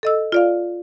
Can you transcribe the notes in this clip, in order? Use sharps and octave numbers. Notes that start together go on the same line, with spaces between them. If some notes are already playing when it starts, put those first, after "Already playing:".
A4 D#5 E6
F4 D5 F5